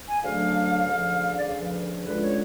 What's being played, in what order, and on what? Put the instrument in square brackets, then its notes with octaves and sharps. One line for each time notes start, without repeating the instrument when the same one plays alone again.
[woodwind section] G#5
D2 C#3 F#3 A3 D4 F5
D2 C#3 F3
D5
D2 C#3 F3 F5
B4
A4
B4
D2 D3 G#3 C#4 F4 B4
C#5